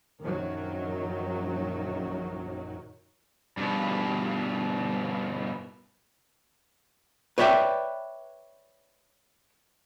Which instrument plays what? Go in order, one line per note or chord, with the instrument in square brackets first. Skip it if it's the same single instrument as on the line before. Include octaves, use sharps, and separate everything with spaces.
[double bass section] A#1 F#2 D#3 F#3
[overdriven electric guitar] G2 B2
[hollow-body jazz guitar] B4 C#5 D5 E5 G5